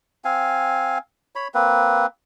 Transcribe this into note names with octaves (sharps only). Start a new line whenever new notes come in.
C4 F5 G#5
C#5 B5
A#3 C4 B4